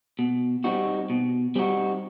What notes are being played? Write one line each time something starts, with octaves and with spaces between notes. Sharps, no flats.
B2
G3 C4 D#4 F#4
B2
G3 C4 D#4 F#4